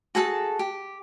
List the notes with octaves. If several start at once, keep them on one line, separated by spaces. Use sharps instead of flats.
F#4 G#4 A4 A5
G4